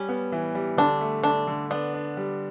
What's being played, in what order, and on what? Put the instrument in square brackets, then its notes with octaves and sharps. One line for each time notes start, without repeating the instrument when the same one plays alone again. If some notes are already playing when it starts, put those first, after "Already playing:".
Already playing: [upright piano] G3 [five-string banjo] C#4
[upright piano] B3
E3
G3
[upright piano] D3 [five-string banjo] D4
[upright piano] A3
[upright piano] D3 [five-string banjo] D4
[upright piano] D3
[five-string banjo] B3 [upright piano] D4
[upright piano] D4
G3